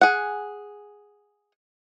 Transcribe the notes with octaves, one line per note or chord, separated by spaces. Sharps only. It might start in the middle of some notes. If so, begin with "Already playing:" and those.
G#4 F#5